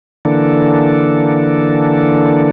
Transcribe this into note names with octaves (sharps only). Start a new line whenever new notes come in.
D3 E3 A#3 D4 A4